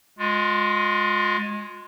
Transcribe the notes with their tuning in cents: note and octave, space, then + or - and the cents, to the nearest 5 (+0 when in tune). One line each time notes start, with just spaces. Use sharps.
G#3 +0 F4 +35